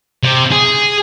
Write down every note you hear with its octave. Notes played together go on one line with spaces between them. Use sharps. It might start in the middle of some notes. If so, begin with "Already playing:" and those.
C3
G#4